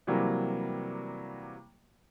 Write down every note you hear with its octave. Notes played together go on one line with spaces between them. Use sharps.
C3 E3 F#3 G3 A#3